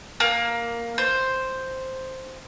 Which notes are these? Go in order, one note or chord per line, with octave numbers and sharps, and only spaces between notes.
A#3
C5